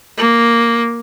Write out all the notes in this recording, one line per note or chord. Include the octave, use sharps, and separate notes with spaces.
A#3